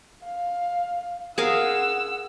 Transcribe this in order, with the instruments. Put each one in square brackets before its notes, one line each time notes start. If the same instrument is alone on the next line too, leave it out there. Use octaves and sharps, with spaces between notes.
[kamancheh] F5
[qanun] G#4 A#4 F5 [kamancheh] F#5 E6